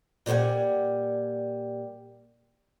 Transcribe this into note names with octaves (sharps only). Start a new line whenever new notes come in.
A#2 G3 C5 F#5 G#5